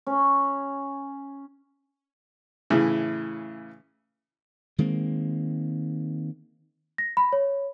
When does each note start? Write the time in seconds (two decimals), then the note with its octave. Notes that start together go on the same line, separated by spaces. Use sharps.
0.07 C#4
2.70 A2 C#3 E3
4.78 D#3 G#3 A#3 C4
6.98 A#6
7.17 B5
7.33 C#5